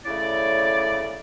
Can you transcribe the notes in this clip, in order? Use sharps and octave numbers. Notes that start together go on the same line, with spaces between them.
C#3 A3 E4 C#5 D5